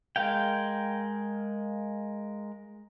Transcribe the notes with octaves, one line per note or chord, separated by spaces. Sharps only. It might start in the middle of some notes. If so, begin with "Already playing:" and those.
G#3 A#4 F5 G5